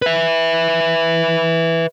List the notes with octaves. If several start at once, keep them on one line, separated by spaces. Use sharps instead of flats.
B4 E5